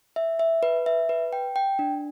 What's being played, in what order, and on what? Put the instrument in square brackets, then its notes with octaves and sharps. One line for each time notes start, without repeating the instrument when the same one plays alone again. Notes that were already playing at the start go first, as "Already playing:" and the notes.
[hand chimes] E5
E5
B4
E5
B4
G5
G5
D4